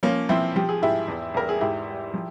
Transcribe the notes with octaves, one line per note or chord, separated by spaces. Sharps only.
F3 A#3 C#4
F3 C4 E4
F3 G4
G#4
G#2 E4 G4
E2
E2 A#4
G#4
G#2 E4 G4
G3
F3